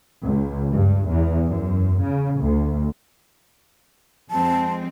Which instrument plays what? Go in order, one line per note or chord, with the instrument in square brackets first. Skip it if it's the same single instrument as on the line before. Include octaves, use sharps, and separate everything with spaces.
[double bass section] C#2
G2
E2
F#2
C#3
D2
[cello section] F2 G#3 C4 [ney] A5